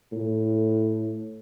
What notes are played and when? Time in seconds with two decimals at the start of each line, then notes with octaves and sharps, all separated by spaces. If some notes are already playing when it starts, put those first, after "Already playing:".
0.12 A2